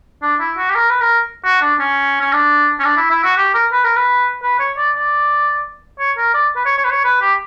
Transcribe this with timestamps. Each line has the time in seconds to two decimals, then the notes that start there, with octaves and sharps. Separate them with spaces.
0.22 D4
0.40 E4
0.57 F#4
0.69 G4
0.75 A#4
0.89 B4
1.00 A#4
1.44 F#4
1.61 D4
1.79 C#4
2.21 C#4
2.32 D4
2.79 C#4
2.84 D4
2.97 E4
3.10 E4
3.24 F#4
3.37 G4
3.54 A#4
3.72 B4
3.84 A#4
3.96 B4
4.42 B4
4.59 C#5
4.77 D5
4.95 D5
5.99 C#5
6.17 A#4
6.34 D5
6.56 B4
6.65 C#5
6.78 C#5
6.84 B4
6.91 C#5
7.04 B4
7.21 G4